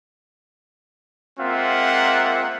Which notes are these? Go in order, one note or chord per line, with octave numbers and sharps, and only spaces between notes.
G#3 A#3 C4 F4 E5 F#5